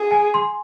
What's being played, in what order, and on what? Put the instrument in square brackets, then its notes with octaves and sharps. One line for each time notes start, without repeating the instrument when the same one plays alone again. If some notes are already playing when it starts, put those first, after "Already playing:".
Already playing: [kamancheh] G#4
[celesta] G#5
C6